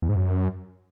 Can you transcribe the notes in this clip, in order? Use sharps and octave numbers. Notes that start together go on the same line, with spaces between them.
E2
G#2
F#2